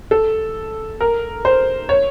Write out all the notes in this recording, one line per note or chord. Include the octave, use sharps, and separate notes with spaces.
A4
A#4
C5
C#5